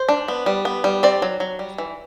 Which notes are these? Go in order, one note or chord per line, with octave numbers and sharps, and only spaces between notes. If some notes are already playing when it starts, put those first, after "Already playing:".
Already playing: C5
D4
B3
G3
B3
G3
C4 D5
F#3
F#3
G3
E3